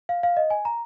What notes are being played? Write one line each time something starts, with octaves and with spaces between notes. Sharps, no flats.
F5
F5
D#5
G#5
A#5